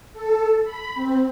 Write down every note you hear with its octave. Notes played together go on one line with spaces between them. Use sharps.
A4
B5
C4